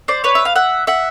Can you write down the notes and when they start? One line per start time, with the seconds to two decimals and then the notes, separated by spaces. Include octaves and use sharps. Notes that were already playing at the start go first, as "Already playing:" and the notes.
0.08 C5 D5
0.24 B4 C#5
0.35 E5
0.45 F5
0.56 E5 F#5
0.87 E5 F#5